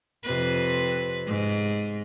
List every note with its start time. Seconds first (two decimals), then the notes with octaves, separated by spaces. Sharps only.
0.24 F2 C3 B4
1.27 G#2